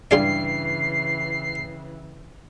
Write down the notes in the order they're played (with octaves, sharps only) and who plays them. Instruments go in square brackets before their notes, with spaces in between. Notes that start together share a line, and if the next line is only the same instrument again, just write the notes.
[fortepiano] G2 [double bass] C#3 E3 [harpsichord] F4 G#4 D5 [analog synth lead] C7